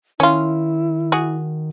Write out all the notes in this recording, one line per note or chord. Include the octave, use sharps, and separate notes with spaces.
D#3 C#4 E4 F4
F#4 G#4